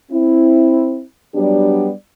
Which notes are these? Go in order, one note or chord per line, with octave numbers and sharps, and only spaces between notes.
C4 E4
F#3 G3 B3 D4 G4 D5